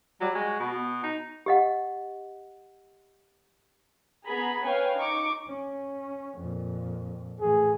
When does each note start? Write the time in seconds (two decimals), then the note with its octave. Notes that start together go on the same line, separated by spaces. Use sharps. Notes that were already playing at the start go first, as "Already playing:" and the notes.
0.21 F#3 G3
0.35 G#3 F#4
0.60 B2
0.73 B3
1.03 D#4
1.46 G4 D#5 F#5
4.27 B3 G#4 A#5 B5
4.65 B4 C#5 F5 G5 G#5
4.97 D#4 C#6 D6
5.48 C#4
6.38 F2 A#2
7.41 A2 E3 G#4